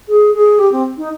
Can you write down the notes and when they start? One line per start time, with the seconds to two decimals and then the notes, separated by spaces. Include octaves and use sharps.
0.08 G#4
0.34 G#4
0.59 G4
0.72 C4
0.97 D#4